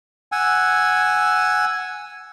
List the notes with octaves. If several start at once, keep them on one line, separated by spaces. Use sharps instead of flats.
F#5 G#5 E6